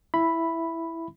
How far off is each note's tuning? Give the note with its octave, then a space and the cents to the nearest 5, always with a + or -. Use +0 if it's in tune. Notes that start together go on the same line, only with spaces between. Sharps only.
E4 +0 E5 +5 B5 +0